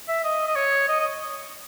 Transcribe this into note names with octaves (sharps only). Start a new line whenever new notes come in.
E5
D#5
D#5
C#5
D#5
D#5